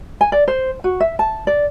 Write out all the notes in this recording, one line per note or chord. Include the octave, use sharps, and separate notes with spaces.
G#5
D5
C5
F#4
E5
A5
D5